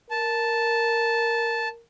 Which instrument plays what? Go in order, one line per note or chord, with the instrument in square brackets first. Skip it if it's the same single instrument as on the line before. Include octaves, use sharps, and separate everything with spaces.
[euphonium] A#4 [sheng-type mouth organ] A5